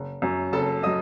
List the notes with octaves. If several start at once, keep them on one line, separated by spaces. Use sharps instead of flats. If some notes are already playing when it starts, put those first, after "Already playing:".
Already playing: F#1
F#2 F#3
F#1 A4 A5
F#3 D#5 D#6